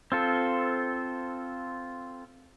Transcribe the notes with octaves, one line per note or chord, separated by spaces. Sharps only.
C4 F4 A4